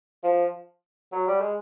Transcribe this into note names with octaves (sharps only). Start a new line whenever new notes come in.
F3
F#3
G3
G#3